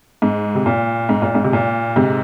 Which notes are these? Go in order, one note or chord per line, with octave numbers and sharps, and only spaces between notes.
G#2
C3
A#2
G#2
A#2
G#2
C3
A#2
G#2 C3